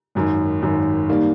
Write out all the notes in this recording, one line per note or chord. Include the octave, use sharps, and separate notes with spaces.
G#1 F#2 D#3
G#1 F#2 D#3
G#2 D#3 G3 A#3